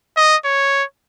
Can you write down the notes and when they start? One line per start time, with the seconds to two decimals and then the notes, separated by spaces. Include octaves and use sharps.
0.17 D#5
0.45 C#5